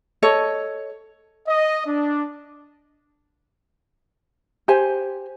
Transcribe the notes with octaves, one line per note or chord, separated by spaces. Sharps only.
A4 C#5 D#5
D#5
D4
G4 C5 G#5